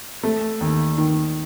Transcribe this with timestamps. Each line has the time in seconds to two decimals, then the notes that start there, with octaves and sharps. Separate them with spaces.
0.23 A3
0.61 D#2
0.98 D#3